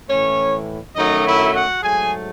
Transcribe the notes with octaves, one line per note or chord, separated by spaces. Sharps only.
A2 E3 A3 C#4 C#5
F#2 D#3 F#3 A3 D#4 D#5
E4 E5
F#4 F#5
G#2 F#3 A3 G#4 G#5